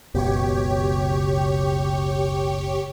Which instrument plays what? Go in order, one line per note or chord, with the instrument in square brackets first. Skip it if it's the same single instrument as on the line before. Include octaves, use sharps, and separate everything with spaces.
[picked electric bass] F#1 C#2 B2 [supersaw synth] G4 C#5